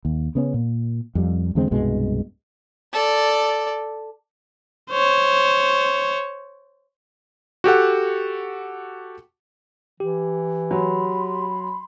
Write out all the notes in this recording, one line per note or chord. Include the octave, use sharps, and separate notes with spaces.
D#2
C#3 B3 C#4
A#2
F2 G3
E2 D3 G#3 C4
C2 G2 B2 G#3
A4 D5
C5 C#5
F#4 G4 A4 F#5
E3 G4
F#3 B5 C6